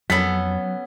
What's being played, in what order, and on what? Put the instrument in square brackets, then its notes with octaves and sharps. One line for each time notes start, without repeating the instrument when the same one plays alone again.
[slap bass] F2 [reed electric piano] F#3 [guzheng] B3 C#4 A4 [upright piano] B6